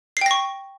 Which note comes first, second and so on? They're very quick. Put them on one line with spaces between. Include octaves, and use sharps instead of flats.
C7 G5 A#6 C#6